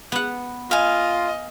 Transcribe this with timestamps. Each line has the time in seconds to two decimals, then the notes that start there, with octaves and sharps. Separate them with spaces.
0.12 B3 F#5
0.71 F4 D#5 F5 G#5